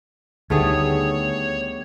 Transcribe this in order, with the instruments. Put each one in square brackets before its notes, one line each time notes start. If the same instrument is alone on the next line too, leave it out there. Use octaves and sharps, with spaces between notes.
[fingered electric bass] D2 [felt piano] D#3 G3 D4 [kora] A3 B3 G#4 [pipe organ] C#5